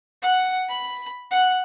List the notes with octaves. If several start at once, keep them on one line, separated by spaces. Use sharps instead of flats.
F#5
B5
F#5